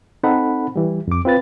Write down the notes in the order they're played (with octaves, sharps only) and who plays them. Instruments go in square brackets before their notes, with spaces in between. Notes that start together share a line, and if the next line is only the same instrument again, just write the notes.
[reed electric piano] C4 D#4 A4 F#5 B5
E3 G3
F2 D6
C4 F4 B4 A6